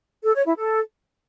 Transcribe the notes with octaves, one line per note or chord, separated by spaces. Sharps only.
A4
C#5
E4
A4